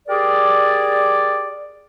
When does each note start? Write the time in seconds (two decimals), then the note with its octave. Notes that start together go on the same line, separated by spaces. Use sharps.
0.08 G4 G#4 A#4 D5